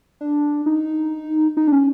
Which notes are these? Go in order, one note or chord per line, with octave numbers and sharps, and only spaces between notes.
D4
D#4
D#4
D4
C#4